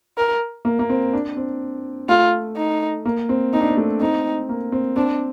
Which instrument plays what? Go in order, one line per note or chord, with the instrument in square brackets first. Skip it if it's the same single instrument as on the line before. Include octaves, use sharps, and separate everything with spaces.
[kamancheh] A#4
[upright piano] A#3
A#3
C4
D4
C4
[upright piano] A3 [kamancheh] F4
[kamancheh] D#4
[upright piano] A#3
C4
[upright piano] C4 [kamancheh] D#4
[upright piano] D4
C4
A3
[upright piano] C4 [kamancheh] D#4
[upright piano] A#3
C4
[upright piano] C4 [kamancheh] D4